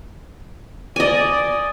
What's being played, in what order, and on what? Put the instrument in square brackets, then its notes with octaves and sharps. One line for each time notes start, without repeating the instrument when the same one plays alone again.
[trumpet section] D5 [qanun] D#5 G#5